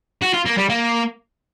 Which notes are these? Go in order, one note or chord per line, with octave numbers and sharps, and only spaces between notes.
F#4
F4
A#3
G3
A#3